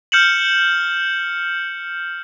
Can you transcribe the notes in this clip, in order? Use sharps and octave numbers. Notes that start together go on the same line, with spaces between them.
F6 G6 C#7 E7 F#7